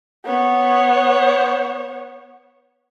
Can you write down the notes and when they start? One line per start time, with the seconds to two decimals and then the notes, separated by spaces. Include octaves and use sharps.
0.25 B3 C#5